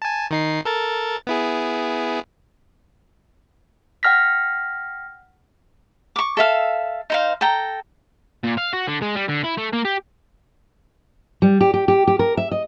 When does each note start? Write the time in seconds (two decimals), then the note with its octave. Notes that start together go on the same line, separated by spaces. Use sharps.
0.02 G#5 A5
0.31 D#3 D#4 C7
0.65 A4 A#4 A6
1.27 B3 E4 G#4
4.03 F#5 G5 F6 A#6 B6
6.16 C#6 D6
6.37 A4 E5 F5
7.10 D#4 C5 F5
7.41 A4 G5 A#5
8.44 A#2
8.58 F5
8.73 F#4
8.88 D3
9.02 G#3
9.15 G3
9.29 D3
9.44 E4
9.57 A3
9.73 A#3
9.85 G4
11.42 G3
11.61 G4
11.74 G4
11.88 G4
12.07 G4
12.19 A#4
12.37 E5
12.51 D#5